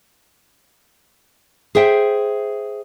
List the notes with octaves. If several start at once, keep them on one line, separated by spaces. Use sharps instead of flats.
G#4 C5 E5 G5